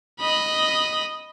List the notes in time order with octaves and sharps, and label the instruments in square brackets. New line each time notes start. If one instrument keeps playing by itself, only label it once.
[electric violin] D#5 B5